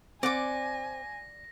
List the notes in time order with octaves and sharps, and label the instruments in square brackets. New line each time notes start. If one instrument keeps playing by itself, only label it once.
[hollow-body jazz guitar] C4 [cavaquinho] D5 F#5 D6 [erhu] G#5 [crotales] A#6